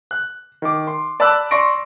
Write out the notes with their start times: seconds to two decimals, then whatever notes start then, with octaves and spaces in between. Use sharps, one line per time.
0.11 F#6
0.62 D#3 D6
0.87 C6
1.20 D5 A5 B5 D6 E6 F#6
1.51 D5 C6 C#6 A#6 D7